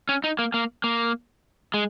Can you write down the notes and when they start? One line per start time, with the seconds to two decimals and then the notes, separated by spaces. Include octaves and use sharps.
0.09 C#4
0.24 D#4
0.39 A#3
0.54 A#3
0.84 A#3
1.74 G#3